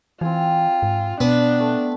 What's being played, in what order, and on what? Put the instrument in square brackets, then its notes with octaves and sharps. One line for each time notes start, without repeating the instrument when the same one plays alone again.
[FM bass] E3 [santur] C4 G#5 [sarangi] F4
[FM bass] G#2
[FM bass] B2 [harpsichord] B3 [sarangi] D4
[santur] A3